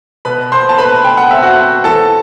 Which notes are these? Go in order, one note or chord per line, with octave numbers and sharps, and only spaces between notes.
B2 B4 B5
B2 C5 C6
A5
A3 B4 B5
B2 G5
F#5
C4 E5
F#4 F#5
C4
E3 A4 A5